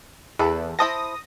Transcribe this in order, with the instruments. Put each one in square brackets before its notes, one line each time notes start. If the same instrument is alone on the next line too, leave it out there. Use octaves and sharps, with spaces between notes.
[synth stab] E2 [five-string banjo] E4 A4 B4
[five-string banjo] E4 C5 A5 [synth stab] D#6 A#6